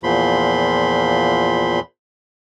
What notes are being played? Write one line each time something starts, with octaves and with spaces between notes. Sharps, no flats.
E2 A#2 F3 B5 C6